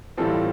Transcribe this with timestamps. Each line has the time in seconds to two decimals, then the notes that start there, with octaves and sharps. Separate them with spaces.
0.17 A2 E3 G3 C4 F4 A4